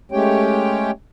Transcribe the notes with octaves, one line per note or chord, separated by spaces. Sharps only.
G#3 A3 C#4 G4 C#5 G5